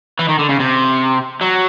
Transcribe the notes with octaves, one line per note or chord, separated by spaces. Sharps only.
E3
D#3
D3
C#3
C3
F#3